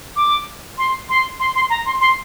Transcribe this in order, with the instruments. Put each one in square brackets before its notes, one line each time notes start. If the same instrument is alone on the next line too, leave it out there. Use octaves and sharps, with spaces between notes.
[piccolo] D6
C6
C6
C6
C6
A#5
C6
C6